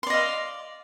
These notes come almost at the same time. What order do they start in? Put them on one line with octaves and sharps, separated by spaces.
C6 D5 D#5 F5